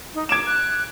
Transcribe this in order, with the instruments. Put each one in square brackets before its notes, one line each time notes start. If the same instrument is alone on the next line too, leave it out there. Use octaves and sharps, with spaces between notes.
[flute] D#4
[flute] D6 [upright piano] G#6 D7 E7
[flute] F#6